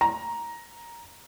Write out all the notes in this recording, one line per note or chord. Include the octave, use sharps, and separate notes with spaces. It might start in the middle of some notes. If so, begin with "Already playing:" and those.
A#5